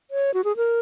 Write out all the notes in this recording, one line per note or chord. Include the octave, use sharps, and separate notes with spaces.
C#5
F#4
G#4
A#4